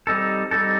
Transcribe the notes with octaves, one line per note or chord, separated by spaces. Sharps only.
G3 C4 D#4 A4
G3 C4 D#4 A4